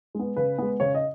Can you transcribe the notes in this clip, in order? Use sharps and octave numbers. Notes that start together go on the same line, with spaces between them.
G#3 B3
C#3 B4
G#3 B3
C#3 C#5
D#5